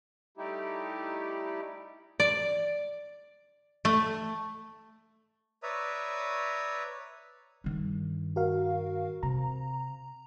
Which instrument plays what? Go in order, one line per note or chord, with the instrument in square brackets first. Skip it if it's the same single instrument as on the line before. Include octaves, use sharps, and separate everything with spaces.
[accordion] G3 A3 D#4 E4 G4
[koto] D5
A3
[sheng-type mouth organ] B4 C#5 D5 E5 A#5 D#6
[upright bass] G2 D#3
[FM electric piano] F#4 A#4 F5
[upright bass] C3 [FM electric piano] A#5